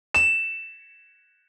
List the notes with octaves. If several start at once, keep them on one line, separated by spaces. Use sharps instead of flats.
E7